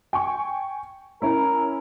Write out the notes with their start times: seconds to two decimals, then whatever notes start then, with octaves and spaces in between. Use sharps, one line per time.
0.13 G5 G#5 C#6
1.22 C#4 E4 A#4